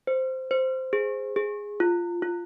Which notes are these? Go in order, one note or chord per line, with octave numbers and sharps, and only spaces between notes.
C5
C5
G#4
G#4
F4
F4